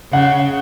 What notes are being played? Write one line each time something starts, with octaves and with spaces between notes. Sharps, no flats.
C#3 F#5